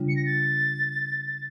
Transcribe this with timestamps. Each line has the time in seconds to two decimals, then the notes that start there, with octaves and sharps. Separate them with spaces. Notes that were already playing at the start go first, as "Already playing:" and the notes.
Already playing: C#3 G3 D4 F4
0.09 C#7
0.16 A#6
0.26 A6